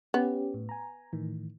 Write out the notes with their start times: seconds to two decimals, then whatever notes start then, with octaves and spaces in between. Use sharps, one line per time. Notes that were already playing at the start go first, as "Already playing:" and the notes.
0.14 B3 C#4 G4
0.54 A2
0.69 G#5 A#5
1.13 A2 D#3 E3